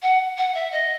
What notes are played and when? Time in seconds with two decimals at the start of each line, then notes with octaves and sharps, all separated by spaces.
0.03 F#5
0.38 F#5
0.54 E5
0.72 D#5